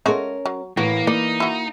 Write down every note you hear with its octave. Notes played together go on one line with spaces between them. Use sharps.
G#3 A3 C#4 F#4 A#4
F#3
A2 E3 A#3 F#4 B4
A#3 D#4 D5
E4 F#4